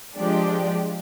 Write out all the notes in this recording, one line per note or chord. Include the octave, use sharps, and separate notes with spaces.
F3 G#3 D4 G4 D5